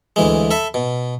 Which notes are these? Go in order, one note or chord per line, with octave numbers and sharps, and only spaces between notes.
D2 E3 G#3
A4 E5 B5
B2